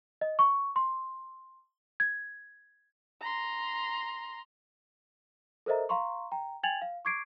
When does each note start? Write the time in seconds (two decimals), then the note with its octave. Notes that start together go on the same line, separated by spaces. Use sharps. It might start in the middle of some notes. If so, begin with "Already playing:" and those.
0.21 D#5
0.39 C#6
0.76 C6
2.00 G#6
3.21 A#5 C6
5.66 A4 A#4 C5 D#5 E5 A#5
5.89 F5 A#5 C6 C#6
6.32 G5 A#5
6.63 G5 G#5 G#6 A6 F7 F#7
6.82 F5
7.05 C#6 D6 G#6 C7 D7